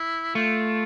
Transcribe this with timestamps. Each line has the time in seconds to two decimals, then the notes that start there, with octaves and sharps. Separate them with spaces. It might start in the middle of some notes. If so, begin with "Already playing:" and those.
Already playing: E4
0.35 A3 F4